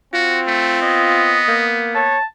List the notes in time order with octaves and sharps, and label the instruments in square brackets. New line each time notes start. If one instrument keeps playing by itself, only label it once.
[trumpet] C4 [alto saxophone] F4 [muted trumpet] F#4
[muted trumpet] A3
[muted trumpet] B3 [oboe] D#5
[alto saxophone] A#3
[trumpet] C#5 [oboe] A5